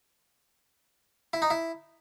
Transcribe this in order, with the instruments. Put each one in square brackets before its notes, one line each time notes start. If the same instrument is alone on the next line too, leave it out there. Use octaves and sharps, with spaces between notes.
[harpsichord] E4
D#4
E4